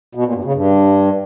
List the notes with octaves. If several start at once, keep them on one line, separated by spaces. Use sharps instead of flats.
B2
A#2
G2
C#3
G2